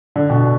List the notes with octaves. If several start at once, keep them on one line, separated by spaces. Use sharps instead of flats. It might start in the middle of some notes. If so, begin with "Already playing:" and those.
D3
B2